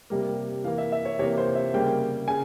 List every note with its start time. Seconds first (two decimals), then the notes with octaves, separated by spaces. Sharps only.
0.10 C3 G3 A#3
0.64 E3 F5
0.68 A#3
0.78 E5
0.92 E5
1.05 C#5
1.19 C3 E3 A#3 C#5
1.38 C5
1.55 E5
1.74 C#3 G3 A#3 G5
2.28 C#3 G#5